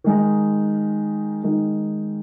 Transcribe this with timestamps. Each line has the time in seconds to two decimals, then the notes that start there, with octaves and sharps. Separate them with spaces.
0.04 D#3 G#3 D#4
1.43 D#3 G#3 D#4